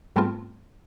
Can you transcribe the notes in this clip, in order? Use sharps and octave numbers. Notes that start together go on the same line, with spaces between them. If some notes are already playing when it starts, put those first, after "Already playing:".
G#2 G3 A3 B3 C4 F4